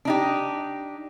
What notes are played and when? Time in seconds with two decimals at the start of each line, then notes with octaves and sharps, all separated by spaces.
0.05 D4 D#4 G4